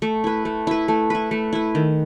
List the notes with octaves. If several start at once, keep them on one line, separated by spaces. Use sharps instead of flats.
A3
E4 B4
A3
E4 B4
A3
E4 B4
A3
E4 B4
D#3